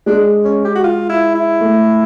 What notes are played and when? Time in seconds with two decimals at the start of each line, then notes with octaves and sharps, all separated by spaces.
0.06 G#3 D4
0.45 C#4
0.65 G4
0.76 F#4
0.84 F4
1.10 E4
1.35 E4
1.61 A3